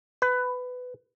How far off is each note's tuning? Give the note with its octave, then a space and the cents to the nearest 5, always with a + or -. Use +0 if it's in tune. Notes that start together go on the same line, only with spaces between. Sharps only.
B4 +15